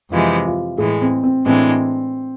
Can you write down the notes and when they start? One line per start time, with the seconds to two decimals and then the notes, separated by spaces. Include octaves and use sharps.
0.11 F2 C3 E3 G#3 F4
0.46 F4
0.78 A2 E3 G#3 G#4
1.01 C4
1.24 C4
1.46 A2 E3 G#3 C4 D4